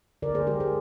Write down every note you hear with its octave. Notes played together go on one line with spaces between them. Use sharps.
D3 A#4 D5
G#4 C5
G#3 G4 A#4
G#4 C5